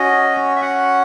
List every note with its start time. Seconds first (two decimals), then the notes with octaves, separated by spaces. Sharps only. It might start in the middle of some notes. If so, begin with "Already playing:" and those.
Already playing: C#4 F#4 D#5
0.56 E5
0.62 F#5